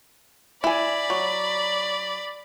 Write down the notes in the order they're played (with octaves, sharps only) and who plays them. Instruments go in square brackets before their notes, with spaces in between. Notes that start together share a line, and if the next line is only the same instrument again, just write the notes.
[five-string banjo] E4 G#5 [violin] D5 B5
[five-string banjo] F#3